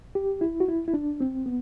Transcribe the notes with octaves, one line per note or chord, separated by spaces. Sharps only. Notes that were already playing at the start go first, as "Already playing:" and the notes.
G4
E4
F#4
E4
E4
D4
C4
B3